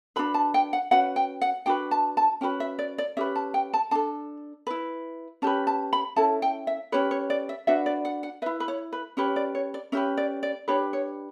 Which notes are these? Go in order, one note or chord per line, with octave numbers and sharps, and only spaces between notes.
D4 F#4 B4 B5
A5
G5
F#5
C#4 F#4 B4 F#5
G5
F#5
D4 F#4 B4 G5
A5
A5
C#4 F#4 B4 G5
E5
D5
D5
C#4 G4 B4 E5
A5
G5
A5
D4 A4 A5
E4 B4
C#4 G4 B4 A5
A5
B5
C#4 E4 A4 A5
G5
E5
C#4 G4 B4 C#5
C#5
D5
E5
D4 F#4 B4 E5
D5
F#5
F#5
E4 B4 E5
B4
C#5
B4
C#4 G4 B4 C#5
D5
C#5
D5
C#4 G4 B4 E5
D5
D5
D4 G4 B4 C#5
C#5